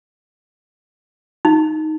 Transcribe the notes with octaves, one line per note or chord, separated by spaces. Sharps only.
D#4